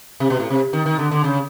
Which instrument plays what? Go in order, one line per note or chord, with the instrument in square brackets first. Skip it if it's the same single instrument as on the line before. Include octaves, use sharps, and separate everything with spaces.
[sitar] C3
B2
A2
C3
D#3
D#3
D3
D3
C#3